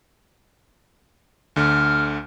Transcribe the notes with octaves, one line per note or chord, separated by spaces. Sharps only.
D2 D3 F6